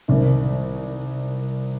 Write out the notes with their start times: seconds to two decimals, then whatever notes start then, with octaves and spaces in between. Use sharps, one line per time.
0.08 C2 C3 D#3